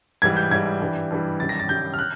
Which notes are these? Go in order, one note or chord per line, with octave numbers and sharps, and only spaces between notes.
G#2 E3 G3 G#6
G6
G#2 E3 G3 G#6
G2 E3 G3
G2 E3 G3
F#2 D#3 G3 A6
A#6
A6
F#2 D#3 G3 G6
F6
F#6